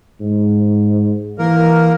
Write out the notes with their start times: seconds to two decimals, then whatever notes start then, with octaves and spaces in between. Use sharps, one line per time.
0.21 G#2
1.39 E3 A#3 A#4